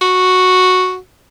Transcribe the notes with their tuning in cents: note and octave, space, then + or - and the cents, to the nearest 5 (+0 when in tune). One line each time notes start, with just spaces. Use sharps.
F#4 -5